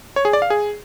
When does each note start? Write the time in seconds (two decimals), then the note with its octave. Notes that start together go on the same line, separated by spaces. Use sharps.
0.16 C#5
0.25 G#4
0.33 D5
0.42 F5
0.50 G#4